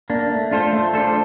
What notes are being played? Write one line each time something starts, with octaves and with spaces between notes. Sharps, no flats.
A#3 D4
A3
D4 F4 A4 C5
A3
D4 F4 A4 C5